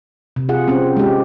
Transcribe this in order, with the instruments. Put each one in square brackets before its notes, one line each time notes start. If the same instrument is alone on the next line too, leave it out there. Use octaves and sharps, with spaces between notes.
[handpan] C3
F4 G#4 F#5
C4 C#4
G#3 G4